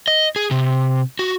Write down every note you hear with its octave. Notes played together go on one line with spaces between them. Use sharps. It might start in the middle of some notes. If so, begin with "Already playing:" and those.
D#5
G#4
C3
F#4